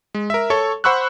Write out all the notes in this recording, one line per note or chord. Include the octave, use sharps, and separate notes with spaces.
G#3
A#4 E5
A4 C#5 C#6
C5 F#5 B5 C#6 E6 F#6